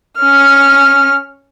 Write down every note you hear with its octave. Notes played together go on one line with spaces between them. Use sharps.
C#4 F6